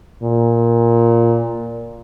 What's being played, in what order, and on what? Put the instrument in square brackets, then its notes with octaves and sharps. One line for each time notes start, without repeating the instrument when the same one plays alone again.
[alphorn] A#2